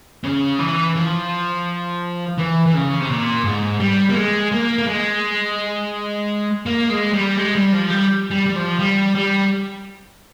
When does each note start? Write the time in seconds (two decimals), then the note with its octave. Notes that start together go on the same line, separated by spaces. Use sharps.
0.24 C#3
0.59 E3
0.95 F3
2.38 E3
2.66 E3
2.74 C#3
3.00 C3
3.09 A#2
3.44 G#2
3.80 G3
4.10 A#3
4.15 G#3
4.52 A#3
4.78 A#3
4.88 G#3
6.66 A#3
6.90 G#3
7.13 G3
7.37 G#3
7.55 G3
7.73 F3
7.90 G3
8.31 G3
8.46 G3
8.56 F3
8.79 G3
9.15 G3